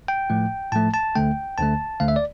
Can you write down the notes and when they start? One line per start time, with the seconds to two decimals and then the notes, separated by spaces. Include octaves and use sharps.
0.08 G5
0.30 A2 F3 A3
0.72 A2 F3 A3 A5
0.94 A5
1.15 D2 D3 A3 G5
1.58 D2 D3 A3 A5
2.00 D2 D3 A3 F5
2.08 E5
2.16 D5